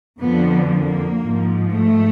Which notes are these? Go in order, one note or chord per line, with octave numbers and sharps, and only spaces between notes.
F2 D3 F3 B3
A#3
G#2 F3
A3